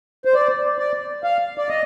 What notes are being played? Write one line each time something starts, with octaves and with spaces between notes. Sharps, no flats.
C5
D5
D5
F5
D5
D#5